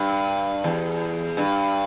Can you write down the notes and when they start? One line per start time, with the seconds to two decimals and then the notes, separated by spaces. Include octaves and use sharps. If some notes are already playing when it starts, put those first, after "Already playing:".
Already playing: G2
0.64 E2
1.37 G2